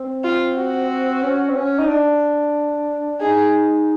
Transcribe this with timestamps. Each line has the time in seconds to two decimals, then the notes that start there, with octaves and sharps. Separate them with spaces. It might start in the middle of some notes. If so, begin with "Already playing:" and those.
Already playing: C4
0.24 F4
0.57 F#4
1.23 C#4
1.49 C4
1.56 C#4
1.79 D#4
1.88 D4
3.21 D#4 G#4